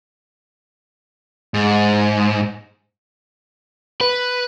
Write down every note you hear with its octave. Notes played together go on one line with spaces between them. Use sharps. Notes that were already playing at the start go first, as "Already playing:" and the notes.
G#2
B4